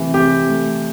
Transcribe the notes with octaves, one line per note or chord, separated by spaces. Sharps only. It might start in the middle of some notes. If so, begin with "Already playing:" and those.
Already playing: C3 E3 A3
C3 G4
A3